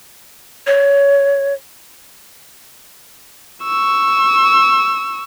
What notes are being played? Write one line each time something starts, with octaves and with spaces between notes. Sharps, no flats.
C#5
C#6 E6